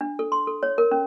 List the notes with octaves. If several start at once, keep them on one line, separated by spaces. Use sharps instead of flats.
D4
A4
C6
A4
C#5
A#4
C#4